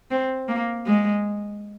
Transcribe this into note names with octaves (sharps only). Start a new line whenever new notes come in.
C4
A#3
G#3